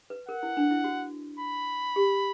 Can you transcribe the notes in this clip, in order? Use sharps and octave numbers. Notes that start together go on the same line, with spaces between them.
B4
A#4 F#5
E4
D4
E4
F#4
B5
G4